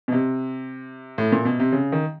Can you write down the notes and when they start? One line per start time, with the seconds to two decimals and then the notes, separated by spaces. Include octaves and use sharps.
0.08 B2
0.12 C3
1.18 A2
1.32 A#2
1.45 B2
1.60 C3
1.72 C#3
1.92 D#3